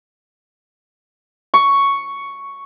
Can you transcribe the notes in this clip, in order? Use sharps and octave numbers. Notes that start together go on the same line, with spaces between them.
C#6